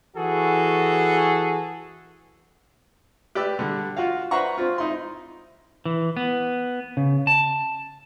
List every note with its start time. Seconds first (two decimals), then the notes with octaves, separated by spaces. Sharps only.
0.16 E3 F#4 G#4 A4
3.35 G4 B4 D5 D6 E6
3.59 D3 G3
3.97 F4 F#4 F5
4.31 B4 C5 E5 F#5 A#5 C#6
4.58 C4 F4
4.78 D#4 E4 C6
5.85 E3
6.17 B3
6.97 C#3
7.27 A5